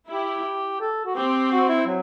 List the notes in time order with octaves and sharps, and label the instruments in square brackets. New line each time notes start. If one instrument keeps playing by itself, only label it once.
[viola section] E4 [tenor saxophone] G4
[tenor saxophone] A4
F#4
[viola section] C4 [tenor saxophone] G4
[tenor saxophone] F#4
E4
F#3